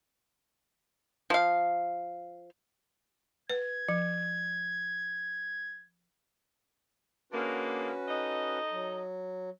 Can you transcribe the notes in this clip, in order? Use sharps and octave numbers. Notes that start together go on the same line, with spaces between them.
F3 F5
B4 G#6
F3
D3 G#3 A#3 C#4 F#4 B4
D#4 A4 D#5
F#3